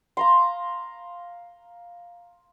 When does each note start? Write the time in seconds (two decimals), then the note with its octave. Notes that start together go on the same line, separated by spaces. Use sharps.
0.17 F5 A#5 C6